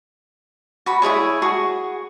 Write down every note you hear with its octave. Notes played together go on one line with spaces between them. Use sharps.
F#4 B5
E4 F4 G#4 C#5
F#4 G#4 C#6